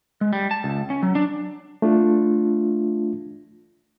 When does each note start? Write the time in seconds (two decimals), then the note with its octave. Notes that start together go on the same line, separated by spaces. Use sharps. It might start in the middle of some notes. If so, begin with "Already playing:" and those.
0.21 G#3
0.33 G3
0.51 A5
0.64 C#2
0.90 C#4
1.03 F#3
1.15 D4
1.82 A3 D4 F4